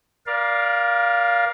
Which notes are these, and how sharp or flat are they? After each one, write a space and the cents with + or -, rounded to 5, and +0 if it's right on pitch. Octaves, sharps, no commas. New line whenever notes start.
A#4 +30 D5 -5 F5 +0